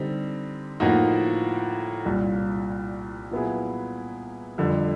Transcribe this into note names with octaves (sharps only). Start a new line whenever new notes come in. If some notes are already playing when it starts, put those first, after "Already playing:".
Already playing: D3 G3 C4 D#4
A2 F3 A#3 D#4 F#4
C2 A#2 G3
A#2 F#3 B3 E4 G#4
F2 D3 G3